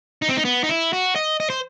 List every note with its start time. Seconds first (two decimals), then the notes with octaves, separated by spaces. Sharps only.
0.22 D#4
0.29 C4
0.37 D#4
0.45 B3
0.64 D#4
0.69 E4
0.93 F#4
1.16 D#5
1.40 D#5
1.50 C5